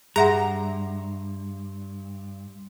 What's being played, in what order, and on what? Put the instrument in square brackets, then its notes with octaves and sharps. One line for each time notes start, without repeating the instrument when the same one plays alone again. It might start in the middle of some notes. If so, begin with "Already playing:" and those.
[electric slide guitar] G2 [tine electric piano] G3 C6 [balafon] G#4 E5 F#5 [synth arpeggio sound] A#5